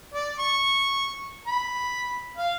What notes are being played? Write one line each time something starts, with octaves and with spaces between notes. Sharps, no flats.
D5
C#6
B5
F5